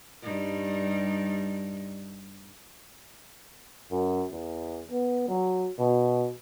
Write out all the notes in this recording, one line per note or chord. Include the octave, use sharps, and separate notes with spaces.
G2 G3 D#4
F#2
E2
B3
F#3
B2